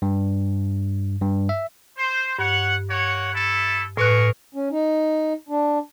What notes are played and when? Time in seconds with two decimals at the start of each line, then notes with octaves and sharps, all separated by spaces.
0.02 G2
1.21 G2
1.49 E5
1.98 C5
2.39 G2 C#5 F#5
2.90 A#3 C#5 F#5
3.33 A3 E4 A4
3.97 A2 G#4 A#4 B4 C#6 F#6
4.55 C#4
4.71 D#4
5.49 D4